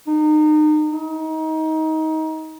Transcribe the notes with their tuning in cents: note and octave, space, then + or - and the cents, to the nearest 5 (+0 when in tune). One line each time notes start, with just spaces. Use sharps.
D#4 -30
D#4 +25